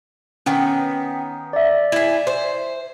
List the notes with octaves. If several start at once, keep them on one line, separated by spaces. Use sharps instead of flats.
D#3 B3 C#4 F#5 G5
D5 E5
E4 G#4
C5